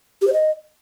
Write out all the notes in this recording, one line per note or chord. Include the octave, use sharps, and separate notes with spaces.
G4
C5
D#5